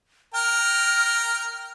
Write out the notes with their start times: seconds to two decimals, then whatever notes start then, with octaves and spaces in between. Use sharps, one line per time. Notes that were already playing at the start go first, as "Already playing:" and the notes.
0.34 A#4 G5 A#5 F6